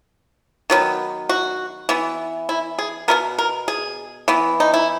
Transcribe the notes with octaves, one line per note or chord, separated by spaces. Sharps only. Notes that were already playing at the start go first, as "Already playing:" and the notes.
D#3 F#3 B3
F#4
E3 B3
E4
G#4
B2 G#3 B3 A#4
A#4
G#4
E3 B3
D#4
E4